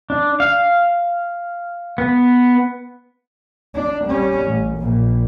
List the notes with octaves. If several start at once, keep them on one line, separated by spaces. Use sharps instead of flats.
D4
F5
B3
D4
G3 C#4
A1
A#1 A#2